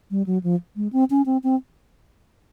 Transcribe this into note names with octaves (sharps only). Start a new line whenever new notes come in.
G3
F#3
F3
G#3
C4
C#4
C4
C4